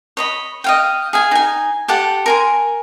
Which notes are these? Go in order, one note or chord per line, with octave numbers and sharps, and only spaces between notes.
C#5 D#5 B5
D#5 F5 G5
G#4 F5 G#5
D#4 G#5
G4 A4 F#5 A5
A#4 G#5 C6